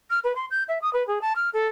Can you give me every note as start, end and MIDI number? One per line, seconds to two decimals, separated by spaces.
0.10 0.19 89
0.24 0.32 71
0.35 0.45 84
0.50 0.63 91
0.68 0.78 76
0.81 0.92 87
0.93 1.05 71
1.07 1.18 68
1.21 1.32 81
1.35 1.49 89
1.53 1.67 69